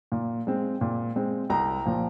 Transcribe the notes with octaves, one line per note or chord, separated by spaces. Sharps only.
A#2
G#3 C4
A#2
G#3 C4
C2 G5 A#5
A#2 F3